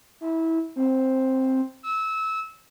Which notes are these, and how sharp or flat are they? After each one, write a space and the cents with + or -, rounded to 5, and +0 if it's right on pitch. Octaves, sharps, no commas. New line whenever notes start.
E4 -20
C4 +5
E6 -25